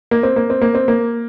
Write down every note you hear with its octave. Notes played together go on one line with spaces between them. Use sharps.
A#3
C4
A#3
C4
A#3
C4
A#3